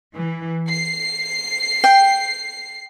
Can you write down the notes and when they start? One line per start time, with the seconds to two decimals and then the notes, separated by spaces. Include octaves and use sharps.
0.17 E3
0.68 C7
1.84 G5